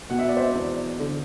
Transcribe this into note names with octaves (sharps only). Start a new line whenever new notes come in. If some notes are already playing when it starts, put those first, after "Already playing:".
B2 F#5
E5
D5
C5 E5
E2
D3